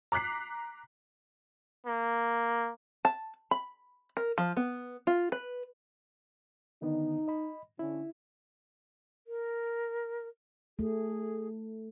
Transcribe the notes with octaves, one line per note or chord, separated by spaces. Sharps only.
A#5 D6 F#6 B6 C7
A#3
A5
B5
A#4
F3
B3
F4
B4
D3 D#3 B3 D#4
D#5 B5
D3 C#4 E4
A#4
A3 G#4